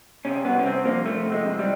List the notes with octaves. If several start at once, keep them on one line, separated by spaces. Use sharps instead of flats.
C3 C#4
C2 B3
C#4
C2 C4
F3 A#3
F3 A3
C3
G#3
C3
G3